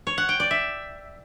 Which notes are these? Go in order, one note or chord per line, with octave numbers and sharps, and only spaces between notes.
C#5
F#5
G5
D5
E5